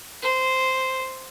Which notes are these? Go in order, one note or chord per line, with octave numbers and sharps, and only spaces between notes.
C5